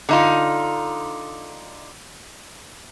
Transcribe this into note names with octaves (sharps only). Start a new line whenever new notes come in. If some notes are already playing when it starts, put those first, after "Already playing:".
D3 D#4 F4